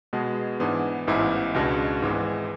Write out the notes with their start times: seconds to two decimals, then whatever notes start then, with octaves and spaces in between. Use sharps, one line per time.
0.13 B2 G#3 B3
0.60 G#2 E3 B3 D4
1.07 A1 G#2 E3 B3 E4
1.54 C#2 B2 G#3 D4
2.02 G#1 G#2 E3 G#3